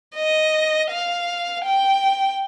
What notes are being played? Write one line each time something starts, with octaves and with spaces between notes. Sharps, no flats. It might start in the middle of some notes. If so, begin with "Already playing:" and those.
D#5
F5
G5